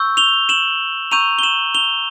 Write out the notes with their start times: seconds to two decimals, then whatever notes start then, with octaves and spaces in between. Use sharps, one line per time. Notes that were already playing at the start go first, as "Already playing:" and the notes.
Already playing: C#6 E6 G6
0.17 F7 G7
0.49 E7 F#7
1.11 A#5 C#6 E6 G6 D#7 F7
1.39 G7
1.43 E7 F#7
1.75 F7 G7